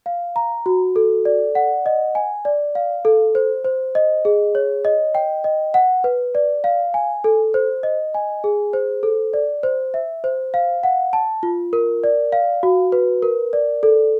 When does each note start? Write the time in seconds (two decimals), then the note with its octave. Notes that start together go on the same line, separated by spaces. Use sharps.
0.06 F5
0.36 A#5
0.66 F#4
0.96 A4
1.25 D5
1.55 F#5
1.86 D#5
2.15 G#5
2.45 D5
2.75 F5
3.05 A4
3.35 C5
3.65 C5
3.95 D#5
4.25 G#4
4.55 C#5
4.85 D#5
5.15 G5
5.44 D#5
5.74 F#5
6.04 B4
6.35 D5
6.64 F5
6.94 G#5
7.24 A4
7.54 C5
7.83 D#5
8.14 G#5
8.44 G#4
8.73 C5
9.03 A4
9.33 D5
9.63 C5
9.94 E5
10.24 C5
10.54 F5
10.83 F#5
11.13 A5
11.43 F4
11.73 A#4
12.04 D5
12.32 F5
12.63 F#4
12.92 B4
13.22 A#4
13.53 D5
13.83 A4